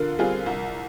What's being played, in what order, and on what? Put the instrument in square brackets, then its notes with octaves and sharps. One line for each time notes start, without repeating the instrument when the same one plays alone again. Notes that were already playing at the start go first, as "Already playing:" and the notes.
Already playing: [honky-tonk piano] D3 F4 [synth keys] A#4
[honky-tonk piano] G3 C4 F4 G#4
C2